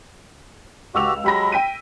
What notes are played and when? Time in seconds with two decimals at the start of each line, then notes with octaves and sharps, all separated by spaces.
0.95 C#2 F#4 G4 E6 F7
1.24 F#3 G#3 G4 B5 A#6
1.52 G5 B6 D#7